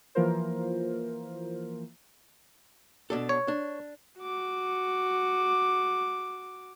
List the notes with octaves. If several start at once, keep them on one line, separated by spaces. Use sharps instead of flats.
E3 F3 A#3 F4 A#4 C5
B2 D4 A4
C#5
D4
F#4 D6